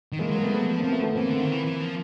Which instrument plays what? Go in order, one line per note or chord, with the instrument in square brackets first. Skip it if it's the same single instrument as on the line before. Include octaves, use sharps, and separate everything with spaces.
[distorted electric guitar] D#3
[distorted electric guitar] E3 [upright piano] G#3 A#3
[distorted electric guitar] F#3 [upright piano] A#3
[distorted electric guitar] G3 [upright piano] A3 B3
[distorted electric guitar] F#3
F3
[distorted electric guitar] F3 [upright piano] A#3 C4
[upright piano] A3 B3
A3 B3
[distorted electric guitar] E3 [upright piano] A#3 C4
[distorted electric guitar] D3
D#3
E3
E3
F3